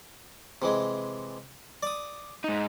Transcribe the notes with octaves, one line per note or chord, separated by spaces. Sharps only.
C3 E3 G#3
D5 D#6
G#2 D#4